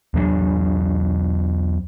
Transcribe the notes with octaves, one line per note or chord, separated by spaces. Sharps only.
E2 F#3 G#3 D4